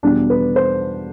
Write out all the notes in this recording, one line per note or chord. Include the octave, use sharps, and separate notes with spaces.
E2 B2 G3 D4
B4
C5